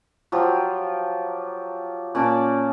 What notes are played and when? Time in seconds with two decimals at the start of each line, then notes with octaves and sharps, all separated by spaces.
0.32 F3 F#3 F4 G4
2.15 A#2 C#4 D5 A5